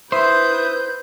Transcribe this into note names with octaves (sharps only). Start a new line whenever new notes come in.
E4 B4 C5 E5 D#6 G6